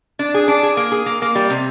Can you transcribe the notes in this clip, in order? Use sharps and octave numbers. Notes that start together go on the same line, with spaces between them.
D4
G#4
D4
G#4
A#3
G#4
A#3
A#3
G3
C3